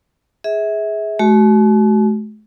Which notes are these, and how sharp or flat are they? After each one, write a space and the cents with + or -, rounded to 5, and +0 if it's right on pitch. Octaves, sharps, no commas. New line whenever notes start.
G#4 +0 E5 -25
A3 -45 F#4 +25